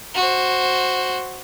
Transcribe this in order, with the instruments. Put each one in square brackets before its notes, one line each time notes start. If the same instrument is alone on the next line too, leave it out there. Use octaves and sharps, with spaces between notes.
[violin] F#4 C5